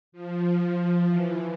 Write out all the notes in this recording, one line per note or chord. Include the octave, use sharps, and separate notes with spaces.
F3
E3